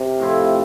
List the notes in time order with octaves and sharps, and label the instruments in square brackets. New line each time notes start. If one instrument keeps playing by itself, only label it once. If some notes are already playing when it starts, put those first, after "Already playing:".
Already playing: [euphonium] C3 [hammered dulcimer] A#4
[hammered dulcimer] A2 F3 C4 E4